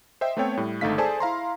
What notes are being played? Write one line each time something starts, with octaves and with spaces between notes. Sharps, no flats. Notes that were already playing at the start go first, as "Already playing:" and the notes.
C5 D#5 E5 G5
A3 B3 C4 A4 C#5 G5
A2 G3
G#1 D3 A3 D#4 F5 B6
G#4 A4 C5 D5 G#5 A5
E4 F5 A#5 C6